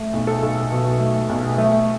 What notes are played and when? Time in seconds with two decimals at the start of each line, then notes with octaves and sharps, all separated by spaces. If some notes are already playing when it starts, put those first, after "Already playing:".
Already playing: A3
0.13 B1
0.27 A4
0.42 B1
0.72 B2
1.00 A3
1.29 B1
1.58 A3